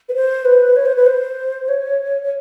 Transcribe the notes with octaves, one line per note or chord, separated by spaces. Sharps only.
B4
C5
B4
C#5
C5
B4
C5
C#5
C#5